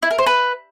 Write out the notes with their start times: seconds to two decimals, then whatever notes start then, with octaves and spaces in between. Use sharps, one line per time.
0.03 E4
0.11 A#4
0.18 C5
0.26 B4